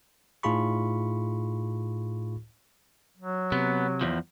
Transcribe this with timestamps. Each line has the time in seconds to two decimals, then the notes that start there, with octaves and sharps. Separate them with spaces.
0.43 A2 D#4 F4 G#4 B5 C#6
3.17 F#3
3.52 C3 B3
4.01 E2 F3